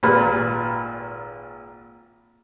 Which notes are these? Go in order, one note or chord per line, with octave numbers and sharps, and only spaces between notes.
G#1 A#2 B4 B5